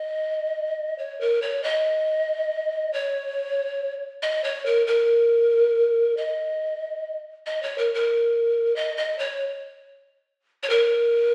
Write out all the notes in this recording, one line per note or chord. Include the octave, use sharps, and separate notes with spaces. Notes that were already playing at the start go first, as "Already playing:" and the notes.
Already playing: D#5
C#5
A#4
C#5
D#5
C#5
D#5
C#5
A#4
A#4
D#5
D#5
C#5
A#4
A#4
D#5
D#5
C#5
C#5
A#4